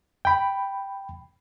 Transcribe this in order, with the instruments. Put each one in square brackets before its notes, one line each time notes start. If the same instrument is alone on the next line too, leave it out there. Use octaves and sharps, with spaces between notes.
[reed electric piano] G5 B5